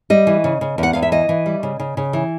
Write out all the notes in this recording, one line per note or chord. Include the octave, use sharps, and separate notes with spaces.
G3 D#5
E3
C#3
C#3
E2
F#5
E2 F5
E5
E3 D#5
E3
G3
C#3
C#3
C#3
E3